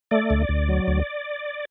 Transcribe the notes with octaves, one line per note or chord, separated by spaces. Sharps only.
A3 D5
D2
D2
F#3
D2